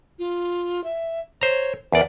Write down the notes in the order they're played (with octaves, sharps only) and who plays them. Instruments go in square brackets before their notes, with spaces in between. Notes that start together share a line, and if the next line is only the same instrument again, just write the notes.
[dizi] F4
E5
[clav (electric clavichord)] C5 A#5 [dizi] C#5
[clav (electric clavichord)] E2 D5 [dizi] A#4